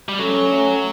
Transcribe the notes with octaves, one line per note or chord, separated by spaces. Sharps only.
G3
F#3 A3 C#4
A3 C#4